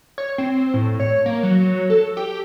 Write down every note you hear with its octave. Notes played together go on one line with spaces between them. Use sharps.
C#5
C4
A2
C#5
A#3
F#3
A4
G4